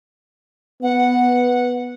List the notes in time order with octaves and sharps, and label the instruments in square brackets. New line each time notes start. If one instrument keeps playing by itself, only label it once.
[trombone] B3 [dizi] F#5